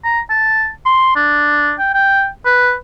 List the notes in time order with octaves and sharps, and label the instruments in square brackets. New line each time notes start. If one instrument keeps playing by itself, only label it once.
[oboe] A#5
A5
C6
D4
G5
G5
B4